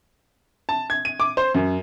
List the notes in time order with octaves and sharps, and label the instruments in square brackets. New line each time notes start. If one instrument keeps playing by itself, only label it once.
[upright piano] A5
G#6
D#7
D6
C5
F#2